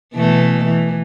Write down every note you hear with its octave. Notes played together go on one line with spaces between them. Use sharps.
B2 E3 A3
E3